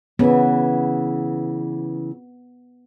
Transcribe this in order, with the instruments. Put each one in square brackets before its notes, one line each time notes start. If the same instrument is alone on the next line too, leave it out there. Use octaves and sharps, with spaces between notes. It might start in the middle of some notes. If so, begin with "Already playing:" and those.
[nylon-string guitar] C#3 E3 [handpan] B3